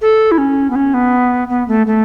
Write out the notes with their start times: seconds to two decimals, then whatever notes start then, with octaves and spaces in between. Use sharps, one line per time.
0.01 A4
0.32 E4
0.38 C#4
0.70 B3
0.76 C#4
0.94 B3
1.49 B3
1.68 A3
1.87 A3